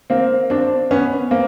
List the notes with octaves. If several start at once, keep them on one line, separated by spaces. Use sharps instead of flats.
A#3 C4
C4 D4
B3 C#4
A#3 C4